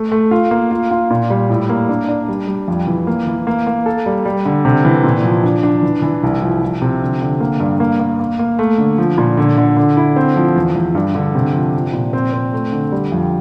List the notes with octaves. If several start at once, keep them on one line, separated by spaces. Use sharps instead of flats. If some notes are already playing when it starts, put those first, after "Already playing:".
Already playing: A3
A3
F4
A#3
F4
F4
A#2
G3
A2
A#3
D4
D4
G3
G3
F2
E3
A#3
E3
A#3
A#3
A4
G3
G3
D3
C3
E3
A#2
F3
D4
D4
E3
E3
C2
F3
F3
C3
D3
D3
A#3
G2
A#3
A#3
A#3
A#3
A3
D3
F3
A#2
D3
D3
D3
E4
C4
F3
E2
E2
G2
D3
C3
F3
F3
A#2
C4
C4
A3
D3
G3
F2